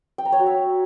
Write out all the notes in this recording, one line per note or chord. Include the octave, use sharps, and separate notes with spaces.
G5
A#5
C#5
F#4
E5